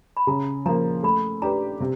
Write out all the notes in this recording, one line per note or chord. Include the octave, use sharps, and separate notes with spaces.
B5
C#3 A#5
F3 A#3 A#5
A3 B5
D4 G4 B4 A#5
C3